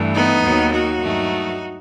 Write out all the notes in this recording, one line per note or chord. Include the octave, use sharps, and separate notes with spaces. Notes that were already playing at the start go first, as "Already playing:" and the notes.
Already playing: G2 E3 A3
B3 D#4
D#2 D#3 F#3
D#4 F#4
G2 D#3 F#3 A3